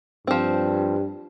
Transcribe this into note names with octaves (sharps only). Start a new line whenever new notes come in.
G2 F3 C4